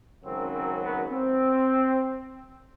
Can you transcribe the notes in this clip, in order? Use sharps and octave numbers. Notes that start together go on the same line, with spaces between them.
G#1 F#2 C#3 F#3 C4
C4
B3
C4